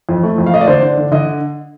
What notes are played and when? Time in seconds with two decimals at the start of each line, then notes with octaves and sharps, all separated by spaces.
0.09 F2
0.23 A3
0.38 F2
0.46 F5
0.53 A3 D#5
0.61 D5
0.67 D3 C5
0.82 D4
0.98 D3
1.12 D3 D#5